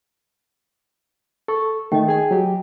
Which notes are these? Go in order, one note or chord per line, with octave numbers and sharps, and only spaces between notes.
A4 C#6
D#3 A3 D#5 G5
G#4 G#5
F#3 G4